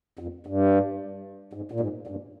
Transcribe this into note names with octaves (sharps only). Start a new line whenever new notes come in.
F2
G2
G#2
A#2
G#2
G2